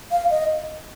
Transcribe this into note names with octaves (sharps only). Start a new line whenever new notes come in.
F5
D#5